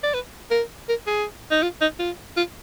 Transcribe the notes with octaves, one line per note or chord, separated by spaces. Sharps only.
D5
B4
A#4
A#4
G#4
D#4
F4
D#4
F4
F4